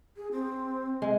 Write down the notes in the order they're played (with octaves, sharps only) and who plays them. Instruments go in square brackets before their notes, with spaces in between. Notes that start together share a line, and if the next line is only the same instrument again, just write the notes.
[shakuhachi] G#4
C4
[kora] G#3